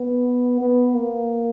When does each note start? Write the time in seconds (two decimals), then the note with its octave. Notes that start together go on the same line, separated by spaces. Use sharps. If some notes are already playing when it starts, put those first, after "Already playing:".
Already playing: B3
0.61 B3
0.95 A#3